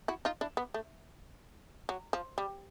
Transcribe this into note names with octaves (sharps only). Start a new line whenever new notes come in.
E4 F#4
D#4 F4
D4 E4
B3
A3
F#3
F3
G3